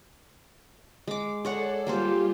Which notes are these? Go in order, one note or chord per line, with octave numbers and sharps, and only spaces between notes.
G#3 D6
G#4 A4 C#5 D5 F#5
G3 A#3 F4 G4 G#4 C5